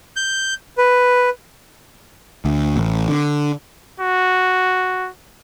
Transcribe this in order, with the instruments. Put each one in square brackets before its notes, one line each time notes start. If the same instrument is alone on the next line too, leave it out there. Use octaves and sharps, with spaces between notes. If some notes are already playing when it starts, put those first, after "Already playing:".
[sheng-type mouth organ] G6
B4
[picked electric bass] D2
A1
D3
[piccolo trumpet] F#4